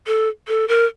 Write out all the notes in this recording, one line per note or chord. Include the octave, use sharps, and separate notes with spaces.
A4
A4
A#4